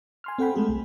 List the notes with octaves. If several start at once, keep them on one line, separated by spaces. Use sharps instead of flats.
G#5 C6 F6
C4 A4 F#5 G5 B5
G#3 A3 G#4 A4
C2